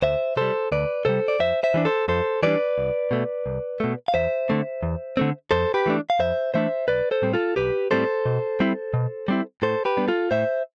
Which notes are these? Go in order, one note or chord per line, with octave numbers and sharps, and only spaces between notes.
D2 C5 E5
C3 G3 A4 C5
D2 B4 D5
C3 G3 A4 C5
D5
F2 C5 E5
C5 E5
E3 G3 D4
A4 C5
F2 A4 C5
E3 G3 D4 B4 D5
C2
B2 A3
C2
B2 A3
F5
E2 C5 E5
D3 A3 C4
E2
D3 A3 C4
F2 A4 C5
G4 B4
E3 A3 D4
F5
F2 C5 E5
E3 A3 D4 C5 E5
B1 B4 D5
A4 C5
A2 G3 C4
F4 A4
B1 G4 B4
A2 G3 C4 A4 C5
B2
G3 C4 E4
B2
G3 C4 E4
A2 A4 C5
G4 B4
G3 B3 D4
F4 A4
A2 C5 E5